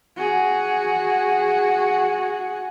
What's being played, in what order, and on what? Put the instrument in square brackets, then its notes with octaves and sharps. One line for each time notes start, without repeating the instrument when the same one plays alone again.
[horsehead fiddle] F#4 G#4